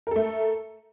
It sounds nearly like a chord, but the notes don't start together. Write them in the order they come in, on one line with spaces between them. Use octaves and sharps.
A#4 A4 A3